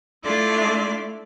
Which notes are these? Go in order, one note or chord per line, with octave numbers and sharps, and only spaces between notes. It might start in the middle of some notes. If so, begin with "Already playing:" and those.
A3 D4 E4 F4 D5